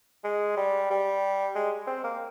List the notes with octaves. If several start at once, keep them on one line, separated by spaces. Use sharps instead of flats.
G#3
G3
G3
G#3
C4
A#3